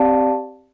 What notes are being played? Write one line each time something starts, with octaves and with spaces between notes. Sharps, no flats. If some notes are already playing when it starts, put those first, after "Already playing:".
Already playing: C4 G4 D5 F5 A5